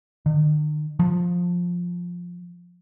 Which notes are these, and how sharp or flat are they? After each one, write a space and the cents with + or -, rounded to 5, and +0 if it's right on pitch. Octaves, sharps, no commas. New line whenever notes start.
D#3 -45
F3 +10